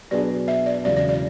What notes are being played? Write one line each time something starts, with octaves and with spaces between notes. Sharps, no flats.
B2 F#3 B3 D4 G#4 D5
E5
D5
E1 E2 C#3 F#3 D5
D5
D5